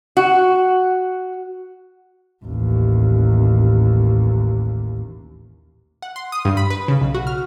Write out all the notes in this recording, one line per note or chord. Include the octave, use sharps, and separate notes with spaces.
F#4
A1 D#2
F#5
C6
D#6
G2
B5
B4
C#3
B1
F#4
F6